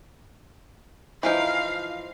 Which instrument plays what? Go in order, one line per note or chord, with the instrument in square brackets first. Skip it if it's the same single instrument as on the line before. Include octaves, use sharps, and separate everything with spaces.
[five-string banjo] E3 F3 D#4 [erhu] F5